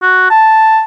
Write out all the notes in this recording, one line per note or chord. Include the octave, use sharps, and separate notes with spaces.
F#4
A5